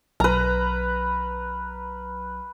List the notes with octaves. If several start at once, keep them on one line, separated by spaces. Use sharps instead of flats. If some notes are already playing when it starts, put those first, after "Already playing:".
B1 F#3 B4 A#5 F6